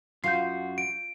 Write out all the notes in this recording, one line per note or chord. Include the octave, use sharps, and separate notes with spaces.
F#2 F4 F#4 G6 C7
D7